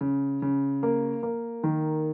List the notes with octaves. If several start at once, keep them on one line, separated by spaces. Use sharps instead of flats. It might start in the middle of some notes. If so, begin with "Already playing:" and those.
C#3
C#3
A#3
A#3
D#3